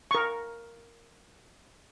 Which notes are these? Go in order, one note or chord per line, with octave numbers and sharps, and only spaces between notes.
A#4 C#6